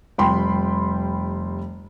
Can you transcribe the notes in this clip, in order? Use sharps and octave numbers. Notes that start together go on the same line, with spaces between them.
F1 G3 G5 B5 C6